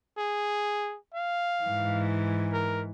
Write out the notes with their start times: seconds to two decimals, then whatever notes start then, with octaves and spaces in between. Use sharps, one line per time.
0.18 G#4
1.14 F5
1.64 G#2 E3
2.53 A#4